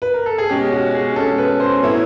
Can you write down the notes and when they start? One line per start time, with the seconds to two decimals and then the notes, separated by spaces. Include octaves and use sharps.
0.02 B4
0.14 A#4
0.26 A4
0.38 G#4
0.50 B2 G#3 C#4 G4
0.72 F#4
0.94 G#4
1.16 B2 G#3 C#4 A4
1.38 B4
1.60 C5
1.82 A2 F#3 B3 E4 C#5